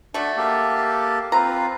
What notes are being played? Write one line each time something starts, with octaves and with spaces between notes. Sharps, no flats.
A3 D4 F#4
A#3 G4 A4
C4 F4 B4 A#5